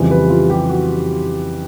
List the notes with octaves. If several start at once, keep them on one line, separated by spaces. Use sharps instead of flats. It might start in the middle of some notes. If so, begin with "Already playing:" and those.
Already playing: F2 C#3 E3 G3
B4
F4
G4
F#4